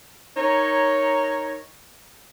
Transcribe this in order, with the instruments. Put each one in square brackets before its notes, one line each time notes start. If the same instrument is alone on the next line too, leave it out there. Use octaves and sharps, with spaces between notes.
[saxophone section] D#4 A#4 C#5